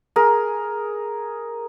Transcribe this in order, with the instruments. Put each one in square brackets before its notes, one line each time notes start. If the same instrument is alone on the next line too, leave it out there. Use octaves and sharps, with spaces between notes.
[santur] G#4 A#4